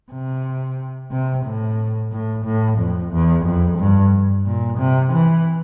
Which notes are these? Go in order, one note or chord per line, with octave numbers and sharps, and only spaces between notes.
C3
C3
A2
A2
A2
F2
E2
F2
G2
A#2
C3
E3